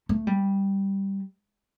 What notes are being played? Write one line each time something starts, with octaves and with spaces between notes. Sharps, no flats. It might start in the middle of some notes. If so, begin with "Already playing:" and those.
A3
G3